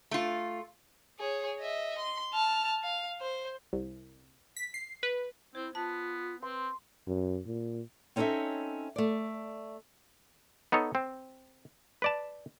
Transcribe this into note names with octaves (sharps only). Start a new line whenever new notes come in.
A3 F4
G#4 C#5
D#5 E5
C6
A5 F6
F5
C5
C2
B6
C7
B4
C4 E4 C5
B3 F4 A5
C4 B4 C6
F#2
A#2
C4 C#4 D#4 A4 C#5 E5
A3 D5
B3 D#4 A4 C#5
C4
B4 D5 A5